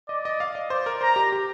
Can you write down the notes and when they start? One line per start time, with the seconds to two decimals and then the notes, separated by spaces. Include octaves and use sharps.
0.09 D5 D#5
0.25 D#5
0.40 F5
0.55 D#5
0.70 C5 D5
0.86 A#4
1.01 C5 A#5
1.16 G4
1.32 G4